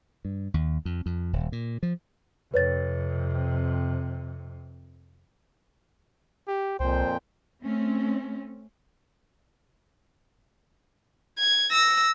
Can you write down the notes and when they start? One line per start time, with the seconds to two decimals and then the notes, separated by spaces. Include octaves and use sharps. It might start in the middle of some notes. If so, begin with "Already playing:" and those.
0.25 G2
0.54 D#2
0.85 F2
1.06 F2
1.33 D#1
1.52 A#2
1.83 F3
2.54 F2 C3 B4 C#5 A6
6.48 G4
6.80 C2 F2 A#2 C5 G5
7.63 A3 C4 C#4
11.38 G#6
11.72 E6 A#6